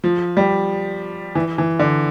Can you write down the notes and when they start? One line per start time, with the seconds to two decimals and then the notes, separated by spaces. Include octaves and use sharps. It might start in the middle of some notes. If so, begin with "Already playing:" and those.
0.04 F3
0.37 G3
1.35 E3
1.58 E3
1.79 D3